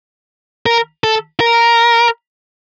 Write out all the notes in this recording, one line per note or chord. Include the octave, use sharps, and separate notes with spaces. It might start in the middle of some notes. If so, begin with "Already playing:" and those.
A#4
A4
A#4